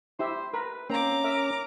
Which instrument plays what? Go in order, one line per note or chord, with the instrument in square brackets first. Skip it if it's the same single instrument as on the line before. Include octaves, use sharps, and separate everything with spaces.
[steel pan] E4 G4 E5 [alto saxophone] C5
[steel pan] A#4 B5 [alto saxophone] B4
[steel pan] A#3 [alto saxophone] C4 [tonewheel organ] C#4 [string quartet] A#5 D6
[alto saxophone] A#4 [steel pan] E5